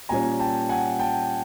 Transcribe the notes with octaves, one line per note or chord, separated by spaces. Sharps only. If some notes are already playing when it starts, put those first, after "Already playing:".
A#2 G3 A#3 C#4 G#5 A#5
G5 A5
F#5 G#5
G5 A5